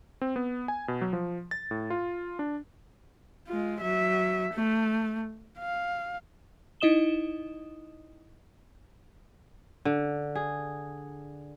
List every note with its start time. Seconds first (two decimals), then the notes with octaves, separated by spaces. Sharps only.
0.21 C4
0.36 B3
0.68 G#5
0.88 B2
1.01 F#3
1.13 F3
1.51 A6
1.71 A2
1.90 F4
2.39 D4
3.47 G#3 F4
3.81 F#3 E5
4.53 A3
5.59 F5
6.80 D#4 E4 D#5 D#6 E7 G7
9.85 D3
10.35 G#4